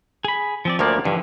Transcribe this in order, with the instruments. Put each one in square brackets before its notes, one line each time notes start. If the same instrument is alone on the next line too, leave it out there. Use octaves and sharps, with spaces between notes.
[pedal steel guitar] G#4 B5
F3 C4 D5
[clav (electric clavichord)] D2 F3 A#3 [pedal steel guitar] C#5 D5
[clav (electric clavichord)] G2 [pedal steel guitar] D3 E3 F3